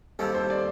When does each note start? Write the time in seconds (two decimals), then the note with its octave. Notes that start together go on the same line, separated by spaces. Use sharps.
0.19 D#2 D#3 G3 C4 A4
0.34 C5
0.50 D5